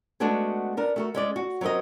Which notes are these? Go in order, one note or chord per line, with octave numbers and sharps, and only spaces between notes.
G#3 A3 B3 D4 F#4 G#4
B3 D4 A#4
A3 F#4 A#4
G#3 C#4 D5
F#4
F#3 C4 C#4 A#4 D#5